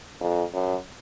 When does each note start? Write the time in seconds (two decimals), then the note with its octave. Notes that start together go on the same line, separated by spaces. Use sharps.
0.20 F2
0.53 F#2